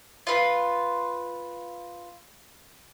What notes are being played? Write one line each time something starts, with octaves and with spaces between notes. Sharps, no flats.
F4 B4